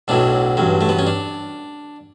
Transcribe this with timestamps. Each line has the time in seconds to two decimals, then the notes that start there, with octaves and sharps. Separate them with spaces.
0.08 B1 A2 F#3 D4
0.57 A1 G2 F#3
0.81 A3
0.89 B3
0.99 C#4
1.07 D4